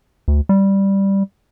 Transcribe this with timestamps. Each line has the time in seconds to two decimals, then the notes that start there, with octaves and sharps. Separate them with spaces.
0.28 D2
0.49 G3